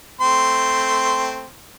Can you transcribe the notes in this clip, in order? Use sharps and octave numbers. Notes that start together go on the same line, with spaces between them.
A3 C4 C6